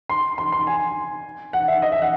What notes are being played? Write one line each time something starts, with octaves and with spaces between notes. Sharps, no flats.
C6
C6
C6
G#5
F#5
E5
D#5
E5
F#5